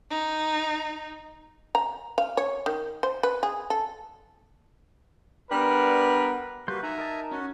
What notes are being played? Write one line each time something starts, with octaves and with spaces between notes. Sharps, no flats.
D#4
A#5
F5
C#5
D#3
C5
B4
G#4
A4
G3 B3 D4 A#4 B4
G3 A#3 F#4 G4 B4 C6 G6
D#4 E5 F#5 G#5 A#5
A#4 D#5 A5
C#4 F#4